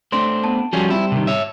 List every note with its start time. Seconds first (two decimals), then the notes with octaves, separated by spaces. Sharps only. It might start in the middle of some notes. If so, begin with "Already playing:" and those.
0.12 A3 C4 D4 C6
0.44 B3 A5
0.73 F3 G3 C#4 F#4 G#4
0.90 C4 E4
1.12 C3 D#3
1.27 C#5 E5